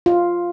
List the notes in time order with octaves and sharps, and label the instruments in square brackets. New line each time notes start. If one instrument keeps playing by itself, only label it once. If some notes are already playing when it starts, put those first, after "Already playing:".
[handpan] F4